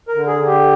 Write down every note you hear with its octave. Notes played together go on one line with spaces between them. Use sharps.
A#4
D3
G#4
D3
G4